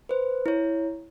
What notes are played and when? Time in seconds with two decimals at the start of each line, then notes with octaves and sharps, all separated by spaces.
0.09 B4 C5
0.46 E4 C#5